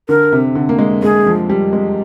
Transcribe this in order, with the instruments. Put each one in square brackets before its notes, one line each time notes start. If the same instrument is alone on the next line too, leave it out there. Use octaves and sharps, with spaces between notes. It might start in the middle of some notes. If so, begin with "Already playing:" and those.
[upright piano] D3 [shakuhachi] A#4
[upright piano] C3
D3
A#3
G#3
[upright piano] G#3 [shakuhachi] G#4
[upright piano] F3
G3
G#3